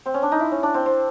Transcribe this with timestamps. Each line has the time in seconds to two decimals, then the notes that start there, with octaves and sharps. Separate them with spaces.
0.06 C4
0.14 C#4
0.23 D4
0.32 D#4
0.40 E4
0.51 C#4
0.63 D4
0.74 C4
0.86 C4